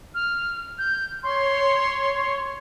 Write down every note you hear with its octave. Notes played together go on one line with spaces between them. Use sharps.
F6
G6
C#5 C6